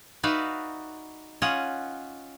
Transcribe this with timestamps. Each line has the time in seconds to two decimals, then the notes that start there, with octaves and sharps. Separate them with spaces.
0.23 D#4 F#4 B4 D5 E5 F5
1.42 C#4 F4 C#5 D#5 F#5